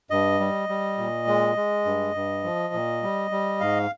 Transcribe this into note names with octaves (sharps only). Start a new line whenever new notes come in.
G2 D#5
G3
G3
A#2
G#3
G#3
G2
G2
F3
A#2
G3
G3
G#2 F5